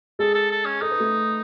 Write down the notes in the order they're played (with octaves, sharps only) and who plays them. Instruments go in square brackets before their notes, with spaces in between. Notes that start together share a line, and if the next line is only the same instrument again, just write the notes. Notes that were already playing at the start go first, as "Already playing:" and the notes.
[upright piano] G#3 G#4 [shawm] A4
[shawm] A4
A4
C#4
[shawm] D#4 [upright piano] A4
[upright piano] B4
A3 A4